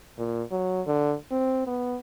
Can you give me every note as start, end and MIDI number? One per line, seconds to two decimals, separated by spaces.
0.18 0.43 46
0.51 0.82 54
0.87 1.15 50
1.31 1.63 60
1.67 1.98 59